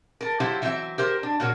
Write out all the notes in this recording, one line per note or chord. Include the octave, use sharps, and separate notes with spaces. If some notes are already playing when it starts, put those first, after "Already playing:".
A4 A#4
F#3 E4 F4 G4 C5
E3 F#3 C4 C5 E5
G4 A#4 C5
D4
A#2 A#3 F#4 A#4 C#5